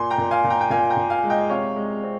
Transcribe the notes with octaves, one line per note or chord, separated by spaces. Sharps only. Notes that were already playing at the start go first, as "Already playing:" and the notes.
Already playing: A#2 G#5 C6
G5 A#5
A#2
F5 G#5
A#2
G5 A#5
G5
A#2 F5 G#5
G5 A#5
A#2
F5 G#5
G#3
D#5 G5
C3 C#5 F5
G#3
C4